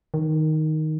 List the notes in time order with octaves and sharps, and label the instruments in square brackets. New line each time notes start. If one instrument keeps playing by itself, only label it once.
[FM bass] D#3